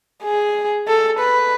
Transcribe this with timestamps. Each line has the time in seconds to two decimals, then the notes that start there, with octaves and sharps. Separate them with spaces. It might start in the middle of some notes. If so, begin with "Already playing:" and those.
0.24 G#4
0.88 A4
1.20 B4